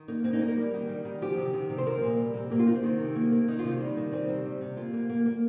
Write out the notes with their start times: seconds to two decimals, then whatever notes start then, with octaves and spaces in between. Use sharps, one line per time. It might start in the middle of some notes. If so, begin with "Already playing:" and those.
Already playing: D#3
0.08 A#3 D#4
0.24 A#3 C4
0.33 D#4
0.41 A#3 D#5
0.48 A#4
0.57 G3
0.73 D#3
0.89 G3
1.05 D#3
1.22 F3 G4
1.37 C3
1.53 D#3
1.70 C3
1.78 C5
1.86 F3 A#4
2.02 A#2
2.18 G3
2.34 C3
2.50 A#3 G4
2.59 F4
2.67 A#3 D#4
2.75 C4
2.83 D#3
2.99 C3
3.15 A#3
3.32 A#3
3.48 D#3 D#4
3.59 C3 F4
3.72 D#4
3.80 G3
3.97 D#3
4.11 G3 C4
4.28 C3
4.44 G3
4.61 C3
4.77 A#3 F4
4.93 A#3
5.09 A#3
5.25 A#3